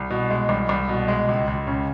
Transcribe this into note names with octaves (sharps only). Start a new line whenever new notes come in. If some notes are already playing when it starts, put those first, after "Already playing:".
Already playing: C2
B2
G#3
C2
C2
B2
G#3
C#2
C#2
C#3